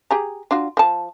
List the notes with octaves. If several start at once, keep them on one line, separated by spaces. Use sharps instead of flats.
G4 G#4 A#5
D4 F4 F#4
F3 A5